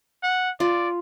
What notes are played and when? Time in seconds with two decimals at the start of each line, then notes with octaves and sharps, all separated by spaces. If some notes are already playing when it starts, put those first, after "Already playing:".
0.23 F#5
0.60 F4 D5